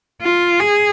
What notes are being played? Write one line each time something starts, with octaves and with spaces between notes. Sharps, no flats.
F4
G#4